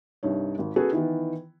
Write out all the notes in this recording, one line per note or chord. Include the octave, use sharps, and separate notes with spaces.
C2 G2 D#4 C#5
G#1
B3 C#4 F#4 G#4 A4 B4
D#3 E3 B3